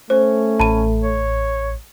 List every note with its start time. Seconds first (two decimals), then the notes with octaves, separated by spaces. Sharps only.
0.10 A3 C#4 C5
0.60 A1 A5 B5 D#7
1.03 C#5